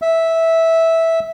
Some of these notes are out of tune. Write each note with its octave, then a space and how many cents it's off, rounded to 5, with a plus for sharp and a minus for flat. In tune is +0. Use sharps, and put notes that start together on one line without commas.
E5 -10